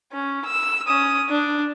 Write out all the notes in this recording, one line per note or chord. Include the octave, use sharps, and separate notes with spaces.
C#4
E6
C#4 D#6
D4